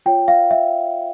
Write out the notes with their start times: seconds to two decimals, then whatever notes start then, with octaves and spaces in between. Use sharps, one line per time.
0.06 F4 C#5 G5
0.28 F5
0.51 E5